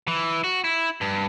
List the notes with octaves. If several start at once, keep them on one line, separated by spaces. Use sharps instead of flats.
E3
F#4
E4
G2